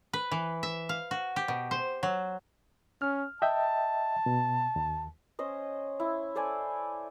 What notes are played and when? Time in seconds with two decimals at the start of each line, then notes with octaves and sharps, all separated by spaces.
0.13 B4
0.32 E3
0.63 E5
0.89 F5
1.11 F#4
1.36 G4
1.48 B2
1.71 C5
2.03 F#3
3.02 C#4 F6
3.42 D#5 E5 G5 A5
4.26 B2
4.76 D#2
5.39 C#4 C5 D#5
6.00 E4
6.35 A4 C5 D5 G#5